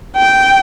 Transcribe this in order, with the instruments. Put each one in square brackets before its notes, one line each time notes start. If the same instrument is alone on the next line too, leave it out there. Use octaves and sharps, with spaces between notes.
[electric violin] G5